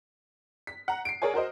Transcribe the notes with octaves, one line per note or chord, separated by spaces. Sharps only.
B6
F#5 A#5
C7 D7
G#4 A#4 C#5 D5 G#5
F#4 A#4 C5 D#5